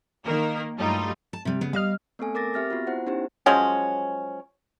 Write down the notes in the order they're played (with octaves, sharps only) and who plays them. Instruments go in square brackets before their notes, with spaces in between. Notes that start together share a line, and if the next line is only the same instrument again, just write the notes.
[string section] D#3 A#3 A#4
G2 F#3 G3 A3 D#4 F4
[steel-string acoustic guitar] A5
C3 G3
C#3 B3
[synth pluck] G3 D#5 F6 [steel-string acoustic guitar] F5
[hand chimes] A3 B3 C4 A4 G#5
A#4 D6 A6 A#6
C4 G4 E5 F6 A6 A#6
B3 F4 F#4
E4 C5 F#5
B3 C#4 D#4 E4 G4 C5
[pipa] F3 F#3 G#3 C#4